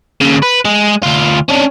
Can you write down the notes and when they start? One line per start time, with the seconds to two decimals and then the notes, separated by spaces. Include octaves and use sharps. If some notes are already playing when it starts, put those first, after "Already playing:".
0.21 D#2 C#3
0.42 B4
0.65 G#3
1.03 D2 F4
1.49 C#4 D4